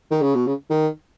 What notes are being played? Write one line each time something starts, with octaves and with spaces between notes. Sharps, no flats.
D#3
C#3
B2
C#3
D#3